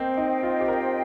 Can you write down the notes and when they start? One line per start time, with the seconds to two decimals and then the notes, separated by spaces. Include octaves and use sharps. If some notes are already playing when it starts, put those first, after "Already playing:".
Already playing: A#3 C4 C5 D#5 G5
0.17 D#4
0.43 F4
0.61 G4
0.68 A#4